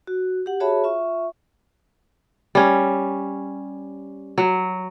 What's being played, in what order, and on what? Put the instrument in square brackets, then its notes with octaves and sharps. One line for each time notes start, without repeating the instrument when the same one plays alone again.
[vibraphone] F#4
G4 F#5
F#4 G#4 C#5 E5 A5 B5
F4 E5 C#6
[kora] G3 C#4
F#3